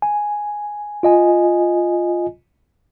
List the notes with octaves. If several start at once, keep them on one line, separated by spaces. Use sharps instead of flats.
G#5
F4 D#5 G#5